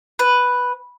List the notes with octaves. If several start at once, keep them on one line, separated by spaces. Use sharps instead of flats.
B4